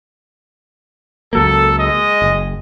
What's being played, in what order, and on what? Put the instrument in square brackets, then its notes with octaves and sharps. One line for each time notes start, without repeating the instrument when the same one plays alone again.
[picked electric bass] C#2 F#3 A#3 [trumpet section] A4
[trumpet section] G#3 D#5
[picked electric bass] F#1